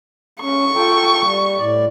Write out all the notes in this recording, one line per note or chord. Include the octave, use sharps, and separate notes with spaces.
C#4 C#6
F4 A4 G5
G3
A2 D5